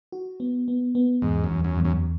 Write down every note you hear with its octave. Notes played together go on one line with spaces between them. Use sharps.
F#4
B3
B3
B3
E2 G#2
F#2
E2
F#2
E2
F#2